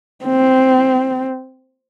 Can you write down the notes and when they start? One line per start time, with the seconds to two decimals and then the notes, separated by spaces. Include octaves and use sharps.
0.24 C4